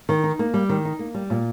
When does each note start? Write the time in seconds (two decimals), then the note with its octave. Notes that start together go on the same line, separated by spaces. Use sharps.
0.09 D#3
0.24 D#4
0.39 A#3
0.54 G3
0.69 D#3
0.85 D#4
0.99 A#3
1.14 G3
1.30 A#2